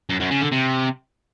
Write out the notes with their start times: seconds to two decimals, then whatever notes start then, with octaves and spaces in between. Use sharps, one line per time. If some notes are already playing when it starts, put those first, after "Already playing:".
0.10 F#2
0.20 F#2
0.31 C#3
0.41 D3
0.52 C3